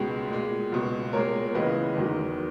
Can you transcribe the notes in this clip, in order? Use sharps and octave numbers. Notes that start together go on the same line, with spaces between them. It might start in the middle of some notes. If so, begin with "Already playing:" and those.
Already playing: C#2 B2 G#3
A#2 G#3
C#2 B2 G#3
A#2 G#3 A#4 C#5
C#2 C#3 E3 G#3 B4 D#5
E2 D#3 F#3